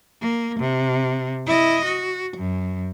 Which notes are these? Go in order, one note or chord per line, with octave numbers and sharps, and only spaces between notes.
A#3
C3
E4 D#5
F#4
F#2